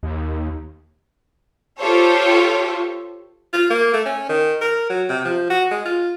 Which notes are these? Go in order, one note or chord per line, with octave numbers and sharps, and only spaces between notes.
D#2
F4 G4 A4 C5 C#5
F4
A#3
A3
C#4
D#3
A#4
F#3
C3
F3
F#4
G#3
F4